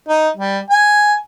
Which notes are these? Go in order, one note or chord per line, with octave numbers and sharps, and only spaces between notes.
D#4
G3
G#5